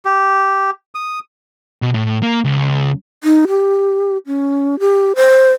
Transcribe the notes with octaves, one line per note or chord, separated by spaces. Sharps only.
G4
D#6
B2
A2
A#3
C#2
D#4
G4
C#4
G4
C5